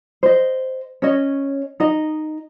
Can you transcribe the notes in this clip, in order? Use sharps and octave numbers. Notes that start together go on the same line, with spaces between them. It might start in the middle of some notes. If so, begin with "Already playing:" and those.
C5 D#5
C#4 C#5 D#5
D#4 D#5